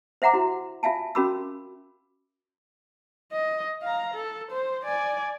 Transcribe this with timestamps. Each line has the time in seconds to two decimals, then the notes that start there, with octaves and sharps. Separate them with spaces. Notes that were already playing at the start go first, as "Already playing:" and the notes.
0.22 C5 E5 F#5 A#5 D6
0.33 E4 F#4
0.83 F4 E5 F5 G#5 A5
1.15 C#4 F#4 A#4 B5 D6 E6
3.32 D#5
3.82 F5 A#5
4.14 A4
4.51 C5
4.85 D5 G#5